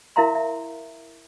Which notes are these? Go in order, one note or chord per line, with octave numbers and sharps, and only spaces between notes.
E4 A#4 E5 F5 A#5 C6
E5